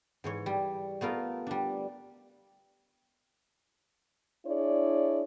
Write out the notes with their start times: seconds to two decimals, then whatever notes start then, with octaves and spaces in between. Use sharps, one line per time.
0.24 G#2 E3 C#5
0.46 G3
1.01 A3 B3 F4 A#4
1.47 G3 D4
4.46 D4 E4 G#4 C#5 D5